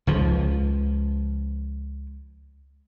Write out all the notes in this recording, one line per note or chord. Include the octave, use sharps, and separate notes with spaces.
C#2 F3